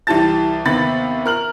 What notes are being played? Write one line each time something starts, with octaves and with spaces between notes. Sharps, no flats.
C2 E3 G4 A5 A6
D#2 C3 B3 B5 A6
A#4 F6 F#7